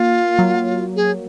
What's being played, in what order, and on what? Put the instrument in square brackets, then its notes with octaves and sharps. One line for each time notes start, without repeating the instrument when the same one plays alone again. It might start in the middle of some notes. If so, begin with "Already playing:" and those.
Already playing: [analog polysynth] A#3 [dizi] F4
[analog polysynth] F#3
[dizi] G#4